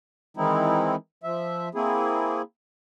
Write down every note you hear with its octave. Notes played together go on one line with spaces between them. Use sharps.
D#3 E3 G#3 C4 D#4 E4
F3 E5
A#3 C4 E4 G#4